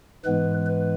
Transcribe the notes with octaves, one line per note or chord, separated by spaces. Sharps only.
G#2 E3 G#3 B3 B4
B4